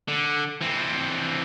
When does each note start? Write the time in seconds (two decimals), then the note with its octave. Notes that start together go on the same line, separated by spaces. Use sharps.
0.08 D3
0.61 E3 C4